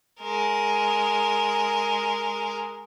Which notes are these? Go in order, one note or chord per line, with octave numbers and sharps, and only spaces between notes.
G#3 A#4